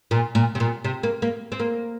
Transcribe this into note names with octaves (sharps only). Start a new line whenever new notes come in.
A#2
A#2
C3
A#2
C3
A#3
A#3
C4
A#3